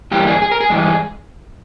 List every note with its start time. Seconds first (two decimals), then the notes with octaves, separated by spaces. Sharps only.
0.11 G#2 E3 G3 A#3 G4
0.27 G#4
0.42 G#4
0.52 A#4
0.60 G#4
0.70 G2 E3 G#3